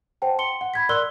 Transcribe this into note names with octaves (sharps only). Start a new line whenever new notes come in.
C5 F#5 G5 A5
C6 C#7 G7
F#5
B5 G#6 B6
A#4 D5 C6 E6 F#6 G7